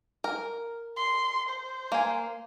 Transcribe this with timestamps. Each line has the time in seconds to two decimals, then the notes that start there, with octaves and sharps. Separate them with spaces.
0.24 A#4
0.96 C6
1.49 C5
1.92 A#3 G#5